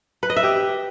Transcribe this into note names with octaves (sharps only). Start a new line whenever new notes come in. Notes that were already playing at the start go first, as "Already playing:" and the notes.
B4
D#5
E5
G4